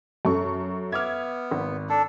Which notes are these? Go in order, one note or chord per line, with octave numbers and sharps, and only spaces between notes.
F#2 A4 C#6
B3 E5 D6 F6 G#6
G#1
D4 A4